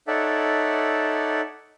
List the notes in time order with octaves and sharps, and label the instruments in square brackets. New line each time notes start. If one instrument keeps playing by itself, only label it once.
[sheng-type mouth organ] D#4 A4 C#5 D5 E5 F#5